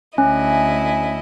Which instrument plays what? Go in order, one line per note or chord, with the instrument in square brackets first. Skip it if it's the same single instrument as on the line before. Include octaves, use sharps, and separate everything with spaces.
[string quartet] D2 E4 D#5 [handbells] C#4